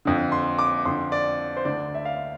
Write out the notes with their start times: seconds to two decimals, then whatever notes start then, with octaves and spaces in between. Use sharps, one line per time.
0.05 F2 D3
0.32 C6
0.59 D6
0.85 F2 D3 C6
1.12 D5
1.56 C5
1.65 D2 D3 D5
1.94 E5
2.05 F5